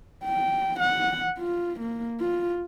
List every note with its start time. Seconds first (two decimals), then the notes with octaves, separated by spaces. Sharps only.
0.24 G5
0.80 F#5
1.39 F4
1.80 A#3
2.20 F4